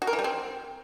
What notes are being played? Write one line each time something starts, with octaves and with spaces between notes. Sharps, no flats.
F#4
A#4
E3
G3
C4